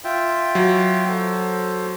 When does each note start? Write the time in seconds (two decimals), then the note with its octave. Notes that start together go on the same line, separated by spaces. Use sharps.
0.04 F4 E5 G5
0.55 F#3
1.09 A4 C5